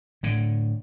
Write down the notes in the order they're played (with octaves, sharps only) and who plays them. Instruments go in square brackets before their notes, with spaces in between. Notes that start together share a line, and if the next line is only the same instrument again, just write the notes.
[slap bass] A2 D3